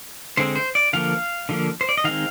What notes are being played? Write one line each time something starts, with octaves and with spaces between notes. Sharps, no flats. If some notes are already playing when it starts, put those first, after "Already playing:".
D3 G#3 C4 C5
C5
D5
D3 F3 A#3 F5
D3 F3 A#3
C5
D5
D#5
D#3 G#3 C4 F5